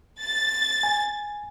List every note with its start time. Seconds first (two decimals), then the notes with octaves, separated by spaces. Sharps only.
0.21 A6
0.83 G#5